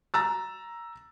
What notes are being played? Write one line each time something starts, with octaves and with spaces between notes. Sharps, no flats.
A#5 E6 A6